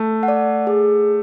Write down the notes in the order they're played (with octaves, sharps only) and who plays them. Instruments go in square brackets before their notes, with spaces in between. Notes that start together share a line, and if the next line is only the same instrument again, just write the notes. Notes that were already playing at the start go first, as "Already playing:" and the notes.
Already playing: [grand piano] A3
[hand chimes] F#5
D5
G#4